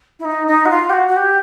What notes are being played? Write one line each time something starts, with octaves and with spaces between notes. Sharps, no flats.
E4
D#4
D#4
F#4
F4
G4
F#4
F#4
G4